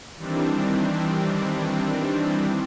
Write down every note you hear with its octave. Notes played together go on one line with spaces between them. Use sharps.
D#3 E3 G3 C4 D4